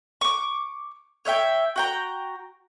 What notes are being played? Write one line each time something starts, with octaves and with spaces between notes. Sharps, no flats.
C#6 D6
C#5 D#5 E5 G5
F#4 G5 A#5